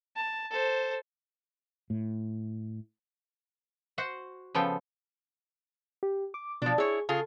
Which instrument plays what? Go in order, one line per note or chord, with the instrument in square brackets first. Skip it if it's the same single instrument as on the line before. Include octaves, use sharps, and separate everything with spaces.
[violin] A5
A4 C5
[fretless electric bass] A2
[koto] F#4 C5 F#5
C#3 F3 B3 A4 G5
[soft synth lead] G4
D6
[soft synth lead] B2 [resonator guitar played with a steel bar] F3 D4
[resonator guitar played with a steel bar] E4 C#5 [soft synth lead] G#4
[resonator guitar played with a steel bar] C#3 F4 G#4 [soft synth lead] A4